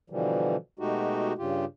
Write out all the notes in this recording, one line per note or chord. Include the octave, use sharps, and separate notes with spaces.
B2 D3 E3 F3 G3
B2 G#3 A3 D#4 F#4 G4
G2 C#3 F4 G4